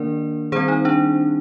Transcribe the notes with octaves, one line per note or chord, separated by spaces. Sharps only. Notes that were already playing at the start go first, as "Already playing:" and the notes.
Already playing: D#3 A#3 D4 A#4 D5
D#3 G3 C4 G#4 C5
D#4
D4